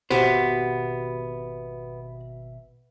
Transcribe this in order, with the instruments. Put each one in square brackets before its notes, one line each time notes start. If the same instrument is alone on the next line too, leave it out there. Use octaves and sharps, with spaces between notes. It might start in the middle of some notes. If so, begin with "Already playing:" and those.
[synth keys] G#1 B2 E5 [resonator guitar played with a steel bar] B3 [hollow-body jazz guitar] F#4 G4 C5